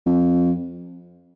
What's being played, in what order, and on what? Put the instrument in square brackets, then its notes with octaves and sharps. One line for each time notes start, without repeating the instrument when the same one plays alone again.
[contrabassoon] F2